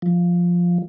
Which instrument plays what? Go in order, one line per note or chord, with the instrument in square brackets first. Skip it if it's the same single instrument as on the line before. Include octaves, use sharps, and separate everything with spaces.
[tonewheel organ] F3